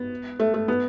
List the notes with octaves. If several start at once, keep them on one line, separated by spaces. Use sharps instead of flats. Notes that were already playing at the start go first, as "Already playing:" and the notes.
Already playing: B3
A3
A3
B3